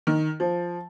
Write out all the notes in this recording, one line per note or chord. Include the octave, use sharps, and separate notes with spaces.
D#3
F3